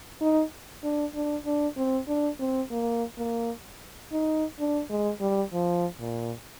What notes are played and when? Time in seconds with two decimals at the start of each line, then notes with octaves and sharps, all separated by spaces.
0.21 D#4
0.84 D4
1.14 D4
1.46 D4
1.77 C4
2.08 D4
2.40 C4
2.71 A#3
3.18 A#3
4.12 D#4
4.59 D4
4.89 G#3
5.21 G3
5.53 F3
6.00 A#2